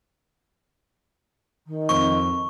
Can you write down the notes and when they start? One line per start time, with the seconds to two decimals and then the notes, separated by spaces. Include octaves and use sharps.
1.66 D#3
1.89 F2 C#6